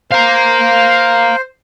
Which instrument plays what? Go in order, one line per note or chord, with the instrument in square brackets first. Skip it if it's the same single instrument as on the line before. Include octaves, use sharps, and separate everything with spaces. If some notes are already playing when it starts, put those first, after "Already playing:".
[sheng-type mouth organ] C5 [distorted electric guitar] F5 A#5